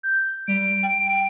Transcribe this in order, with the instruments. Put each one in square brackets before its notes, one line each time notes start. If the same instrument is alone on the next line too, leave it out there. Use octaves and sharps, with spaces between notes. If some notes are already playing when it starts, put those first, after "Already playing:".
[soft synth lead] G6
[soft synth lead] G3 [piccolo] D7
[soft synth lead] G5